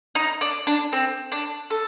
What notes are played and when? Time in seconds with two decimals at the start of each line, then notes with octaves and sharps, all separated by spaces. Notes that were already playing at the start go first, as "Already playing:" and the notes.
0.15 D#4
0.41 D4
0.67 D4
0.93 C4
1.32 D4
1.70 A4